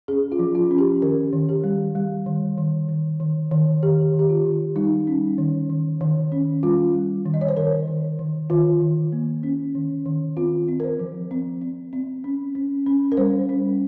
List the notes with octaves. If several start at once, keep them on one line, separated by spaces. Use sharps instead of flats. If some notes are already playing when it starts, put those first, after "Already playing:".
C#4 G#4
F4
F3
F4
C#4
G4
D#3 A#4
D#3
G4
G3
G3
D#3
D#3
D#3
D#3
D#3
D#3 G4
D#3
G4
F4
D#3
G3 D#4
C#4
D#3
D#3
D#3
C#4
G3 F4
G3
D#3
D#5
C#5
C5
D#3 A#4
D#3
D#3
D#3 F4
D#3
A#3
C#4
D#3
D#3
C4 F4
C4
A#4
C5
F3
C4
C4
C4
C#4
C#4
C#4
A#4
G3 C5
C#4